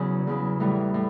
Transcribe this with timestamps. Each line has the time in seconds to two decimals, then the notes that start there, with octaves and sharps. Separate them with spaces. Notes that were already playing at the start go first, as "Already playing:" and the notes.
Already playing: E2 C#3 F#3
0.27 E2 C#3 F#3
0.60 A2 E3 G3
0.94 A2